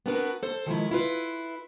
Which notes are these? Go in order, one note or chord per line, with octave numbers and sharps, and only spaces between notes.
B3 C4 D4 F#4 A#4 B4
A4 C5
D#3 F3 G#3 E4
E4 F4 B4